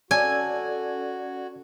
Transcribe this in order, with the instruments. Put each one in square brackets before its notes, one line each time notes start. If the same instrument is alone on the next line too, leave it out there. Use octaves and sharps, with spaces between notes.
[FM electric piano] C#4 A4 G#6 [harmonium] F#4 [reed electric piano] D5 [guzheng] G#5